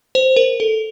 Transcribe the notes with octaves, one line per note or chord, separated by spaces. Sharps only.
C5
A#4
A4